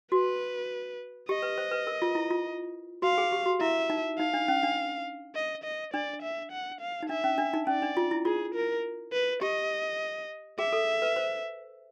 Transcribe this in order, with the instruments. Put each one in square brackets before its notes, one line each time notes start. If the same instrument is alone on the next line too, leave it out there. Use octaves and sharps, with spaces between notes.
[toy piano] F#4 [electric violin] B4
[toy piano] G4 [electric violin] D#5
[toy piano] B4
C5
B4
A#4
F4
E4
F4
[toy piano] F#4 [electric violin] F5
[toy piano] G#4
G4
F#4
[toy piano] E4 [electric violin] E5
[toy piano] D#4
[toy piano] D#4 [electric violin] F5
[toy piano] D4
C#4
D4
[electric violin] D#5
D#5
[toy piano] D4 [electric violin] D5
[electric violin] E5
F#5
F5
[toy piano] D#4
[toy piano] D4 [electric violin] E5
[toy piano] C#4
D4
D#4
[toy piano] C#4 [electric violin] D5
[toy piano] D4
F4
E4
[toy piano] F4 [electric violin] G#4
[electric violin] A#4
B4
[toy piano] G4 [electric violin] D#5
[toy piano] G#4 [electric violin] E5
[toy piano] A4
B4
C5